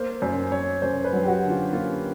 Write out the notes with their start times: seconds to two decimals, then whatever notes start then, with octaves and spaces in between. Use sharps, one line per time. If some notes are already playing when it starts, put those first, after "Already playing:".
Already playing: A#3 C5
0.22 F#2 C5
0.52 F#2 C#5
0.82 F#2 C5
1.04 B4
1.13 F#3
1.23 G4
1.28 F#4
1.43 D3
1.50 F4
1.73 A#3 F4